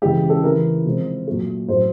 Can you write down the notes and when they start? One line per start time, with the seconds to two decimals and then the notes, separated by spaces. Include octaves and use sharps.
0.02 C#3 E3 G#3 G4
0.30 A4
0.43 C#3 E3 A3 A#4
0.85 C3 F3 G#3
1.27 A#2 F#3 A3
1.68 A2 F#3 A3 C5